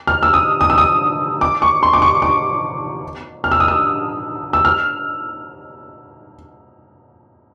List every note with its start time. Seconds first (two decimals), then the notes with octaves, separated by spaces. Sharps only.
0.07 F6
0.23 E6
0.34 D#6
0.61 D#6
0.70 E6
0.78 D#6
1.41 D6
1.62 C#6
1.83 C6
1.93 D6
2.02 C#6
2.22 D6
3.44 F6
3.52 E6
3.60 D#6
3.68 E6
4.53 E6
4.65 F6